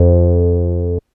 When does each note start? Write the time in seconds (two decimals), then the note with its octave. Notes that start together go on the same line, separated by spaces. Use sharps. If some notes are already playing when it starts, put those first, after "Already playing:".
Already playing: F2